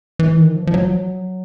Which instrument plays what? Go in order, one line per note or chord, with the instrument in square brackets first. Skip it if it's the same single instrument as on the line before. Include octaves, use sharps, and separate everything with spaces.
[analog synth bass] E3
D#3
F3
F3
F#3